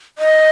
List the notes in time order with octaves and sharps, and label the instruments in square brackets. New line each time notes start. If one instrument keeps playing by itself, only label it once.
[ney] D#5